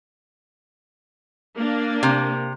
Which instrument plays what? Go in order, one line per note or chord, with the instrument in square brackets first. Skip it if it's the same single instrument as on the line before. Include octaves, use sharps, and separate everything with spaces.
[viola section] A#3 D4
[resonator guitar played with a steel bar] C3